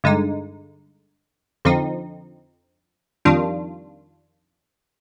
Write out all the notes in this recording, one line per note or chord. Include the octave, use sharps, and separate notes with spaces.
G2 D3 G#3 D#4
F2 D3 F3 C4 D#4
F2 D#3 G3 D4 F4